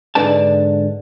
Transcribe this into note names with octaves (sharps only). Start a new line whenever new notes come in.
G#2 D3 D4 B4 D5 A5